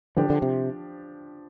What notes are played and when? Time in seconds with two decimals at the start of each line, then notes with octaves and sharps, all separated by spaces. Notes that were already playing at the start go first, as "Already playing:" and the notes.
0.16 D3 F3 D4 G4 C5
0.30 D3
0.42 C3